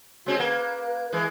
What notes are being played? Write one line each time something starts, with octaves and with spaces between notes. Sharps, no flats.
G#3 C4 C#4 F#4
A#3 B4
E3 G#3